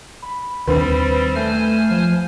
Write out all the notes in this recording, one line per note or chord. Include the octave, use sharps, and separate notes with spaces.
B5
D#2 D#3 G3 C4 D4 B4 C5
A3 C5 G#5 F6
F3